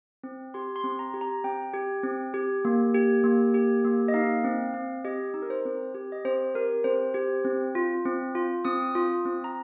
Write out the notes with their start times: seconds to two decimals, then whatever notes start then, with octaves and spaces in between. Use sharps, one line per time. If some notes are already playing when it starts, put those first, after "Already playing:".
0.23 C4
0.54 G4 C6
0.76 C6
0.84 C4
0.99 A#5
1.14 G4
1.21 A#5
1.44 C4 G5
1.74 G4
2.03 C4
2.34 G4
2.65 A#3
2.94 G4
3.24 A#3
3.54 G4
3.85 A#3
4.08 D#5
4.14 D#4 F5
4.44 C4
4.74 C4
5.05 G4 D#5
5.34 D#4
5.42 A#4
5.50 C5
5.65 C4
5.95 G4
6.12 D#5
6.25 C4 C5
6.55 G4 A#4
6.84 C4 C5
7.14 G4
7.44 C4
7.75 F4
8.06 C4
8.35 F4
8.65 C4 D#6
8.95 F4
9.25 C4
9.44 A#5